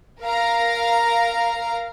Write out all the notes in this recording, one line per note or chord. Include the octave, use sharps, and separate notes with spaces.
A#4 F5 A#5